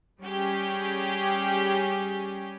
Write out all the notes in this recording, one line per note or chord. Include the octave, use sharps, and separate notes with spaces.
G3 C#4 G4 G#4